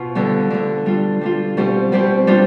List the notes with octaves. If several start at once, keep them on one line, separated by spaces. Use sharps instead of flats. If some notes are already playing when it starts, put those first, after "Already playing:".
Already playing: B2 F4
D3 G3 B3
D3 G3 B3
G3 D4 F4
G3 D4 F4
B2 G3 C4 G4
B2 G3 C4 G4
G3 B3 D4 F4